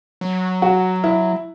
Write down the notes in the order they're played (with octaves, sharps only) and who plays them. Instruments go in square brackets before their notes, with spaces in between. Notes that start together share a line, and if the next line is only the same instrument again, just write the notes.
[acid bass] F#3
[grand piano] F#4
E4